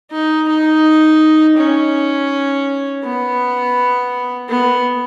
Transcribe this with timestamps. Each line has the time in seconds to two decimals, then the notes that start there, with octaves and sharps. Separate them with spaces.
0.11 D#4
0.48 D#4
1.58 C#4
3.04 B3
4.49 B3